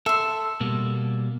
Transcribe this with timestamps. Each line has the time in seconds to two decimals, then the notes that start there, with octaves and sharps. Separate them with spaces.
0.06 A4 E5 C6
0.61 B2 G3 A#3